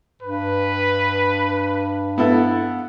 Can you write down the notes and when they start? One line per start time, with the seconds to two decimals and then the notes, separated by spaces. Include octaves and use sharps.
0.22 G2 B4
2.18 B3 E4 A4 F#5